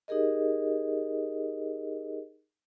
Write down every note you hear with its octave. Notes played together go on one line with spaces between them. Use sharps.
D#4 G4 G#4 A#4 D#5